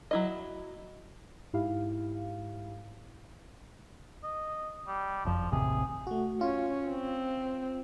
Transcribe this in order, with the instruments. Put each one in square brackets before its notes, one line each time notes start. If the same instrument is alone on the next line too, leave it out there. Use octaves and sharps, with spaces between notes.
[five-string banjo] F#3 E4 D#5
[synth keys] G#2 E4 G4 F5
[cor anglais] D#5
G3
[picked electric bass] F#1 F2 [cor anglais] F3
[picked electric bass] A1 D#2 C3 [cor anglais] G#4
[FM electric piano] A3 F#4
[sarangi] C#4 [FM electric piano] F4
[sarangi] C4